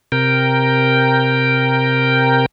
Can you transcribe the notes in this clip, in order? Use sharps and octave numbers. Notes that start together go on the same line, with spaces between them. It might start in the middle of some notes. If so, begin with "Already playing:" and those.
C3 A#4 G5